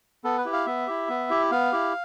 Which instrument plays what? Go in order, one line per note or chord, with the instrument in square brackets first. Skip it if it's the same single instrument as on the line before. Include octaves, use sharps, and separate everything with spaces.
[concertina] B3 A4
B4
E4 G4
F5
B3 E5
E4 G4
B3
E4 G4
B3 F5
E4 G4